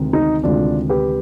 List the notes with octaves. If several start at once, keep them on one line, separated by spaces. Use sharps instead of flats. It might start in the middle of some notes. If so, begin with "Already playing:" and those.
Already playing: D2 C3 D#3 G#3
D#4
D2 C3 D#3 G#3 D4 F4
G4 B4